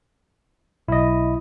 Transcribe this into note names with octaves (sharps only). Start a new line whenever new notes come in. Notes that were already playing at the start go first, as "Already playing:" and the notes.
B1 E4 D#5